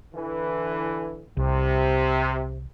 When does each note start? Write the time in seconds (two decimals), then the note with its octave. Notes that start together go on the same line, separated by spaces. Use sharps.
0.13 D3 E3
1.37 C2 C3